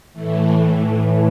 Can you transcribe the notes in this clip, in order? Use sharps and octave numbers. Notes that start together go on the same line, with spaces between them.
A2 E3 A3
A3